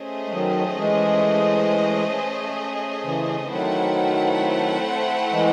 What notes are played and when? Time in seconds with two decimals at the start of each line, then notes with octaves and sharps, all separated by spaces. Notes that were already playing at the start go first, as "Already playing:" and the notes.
Already playing: A3 C#4 G#4 C5 D#5
0.26 G#3
0.32 D#3 F#3
0.77 E3 G#3
3.04 C#3 E3
3.49 D#3 F#3 A3 C4 E4 C5 F#5
5.31 E3 G#3